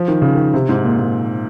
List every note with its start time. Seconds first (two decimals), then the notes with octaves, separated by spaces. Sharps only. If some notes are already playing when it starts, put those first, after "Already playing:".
Already playing: F3
0.08 D#3
0.22 C#3
0.35 D#3
0.54 C3
0.69 G#2
0.84 A#2
0.99 A#2